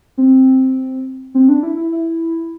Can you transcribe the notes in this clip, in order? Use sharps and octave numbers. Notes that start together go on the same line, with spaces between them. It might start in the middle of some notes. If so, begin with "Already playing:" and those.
C4
C4
D4
E4
E4
E4